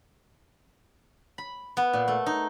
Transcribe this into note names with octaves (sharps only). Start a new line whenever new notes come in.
B5
B3
A#2
A3
D#4